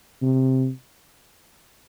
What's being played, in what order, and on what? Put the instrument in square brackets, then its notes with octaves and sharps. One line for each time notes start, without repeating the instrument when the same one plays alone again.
[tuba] C3